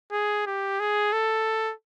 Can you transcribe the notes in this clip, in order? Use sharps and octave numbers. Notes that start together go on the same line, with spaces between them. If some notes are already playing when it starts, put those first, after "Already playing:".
G#4
G4
G#4
A4